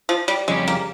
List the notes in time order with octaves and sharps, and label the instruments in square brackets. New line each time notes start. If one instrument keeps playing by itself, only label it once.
[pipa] F3
G3
[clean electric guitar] F2 C#3 G3 C#4 G4 [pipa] G#3
[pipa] A#3